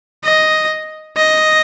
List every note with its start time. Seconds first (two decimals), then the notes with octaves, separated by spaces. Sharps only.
0.24 D#5
1.17 D#5